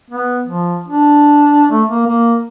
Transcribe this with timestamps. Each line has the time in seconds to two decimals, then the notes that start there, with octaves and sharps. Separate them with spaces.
0.11 B3
0.47 F3
0.88 D4
1.71 A3
1.89 A#3
2.07 A#3